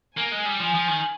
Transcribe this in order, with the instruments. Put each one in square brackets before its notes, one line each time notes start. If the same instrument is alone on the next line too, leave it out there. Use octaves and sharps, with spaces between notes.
[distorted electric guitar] A#3 [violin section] G#5
[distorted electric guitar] G#3
G3
[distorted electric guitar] F3 [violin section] G#5
[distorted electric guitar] F3
D#3